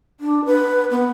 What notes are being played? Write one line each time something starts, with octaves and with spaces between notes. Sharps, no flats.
D4
B4
B3